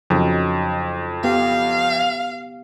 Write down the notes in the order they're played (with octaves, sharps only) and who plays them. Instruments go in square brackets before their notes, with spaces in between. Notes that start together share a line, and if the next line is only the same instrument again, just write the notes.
[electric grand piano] F2 [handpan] C#3 F#3 D#4
[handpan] B3 G4 [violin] F5